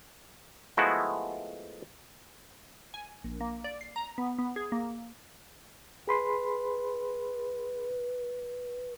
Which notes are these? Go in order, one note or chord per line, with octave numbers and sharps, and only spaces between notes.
F3 G#3 A3 B3 E4 F#4
G#5
A#1
A#3
D5
C7
A#5
B3
B3
G#4
A#3
G#4 B4 B5 C6